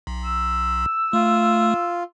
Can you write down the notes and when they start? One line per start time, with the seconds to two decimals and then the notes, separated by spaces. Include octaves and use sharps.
0.07 B1
0.24 E6
1.13 A3 F4